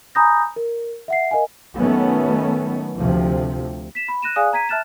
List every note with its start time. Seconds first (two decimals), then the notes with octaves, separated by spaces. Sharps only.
0.15 G#5 A#5 B5 D#6 G6 A#6
0.56 A#4
1.08 E5 F#5 C7
1.31 A#4 D#5 F5 G#5
1.78 D#3 F#3 A3 B3 C#4
2.98 D2 C3 F3
3.95 B6 E7
4.08 B5
4.22 F#6 A#6 D#7 E7
4.36 G#4 D5 F5 G#5 D#6 F#6
4.53 A#5 G#6 B6 D#7
4.69 E5 A5 F6 F#6 A6 E7